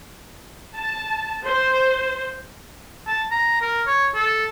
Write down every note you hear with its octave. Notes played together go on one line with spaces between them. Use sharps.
A5
C5
A5
A#5
A#4
C#5
A4